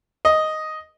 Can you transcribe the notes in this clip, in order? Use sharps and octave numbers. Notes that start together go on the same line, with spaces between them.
D#5